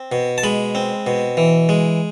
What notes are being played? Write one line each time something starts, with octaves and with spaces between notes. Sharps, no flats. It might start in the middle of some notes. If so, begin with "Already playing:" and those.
Already playing: C4
B2
A5
G#3 B5
C4
B2
E3
G#3